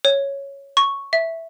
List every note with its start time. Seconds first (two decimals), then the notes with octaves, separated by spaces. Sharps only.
0.05 C#5
0.77 C#6
1.13 E5